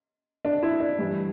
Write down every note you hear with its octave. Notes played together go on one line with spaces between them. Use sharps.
D4
E4
D4
G2 E3 G3